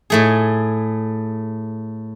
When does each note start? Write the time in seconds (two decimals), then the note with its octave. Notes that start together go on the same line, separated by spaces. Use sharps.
0.10 A2 A3 G#4